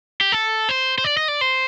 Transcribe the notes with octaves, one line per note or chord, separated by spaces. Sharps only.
G4
A4
C5
C5
D5
D#5
D5
C5